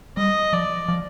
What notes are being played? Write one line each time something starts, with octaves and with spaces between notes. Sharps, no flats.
G3 D#5
F3 D5
F3